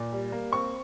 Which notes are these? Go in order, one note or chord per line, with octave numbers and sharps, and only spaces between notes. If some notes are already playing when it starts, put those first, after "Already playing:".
Already playing: A#2
G3
A#3
C4 C#6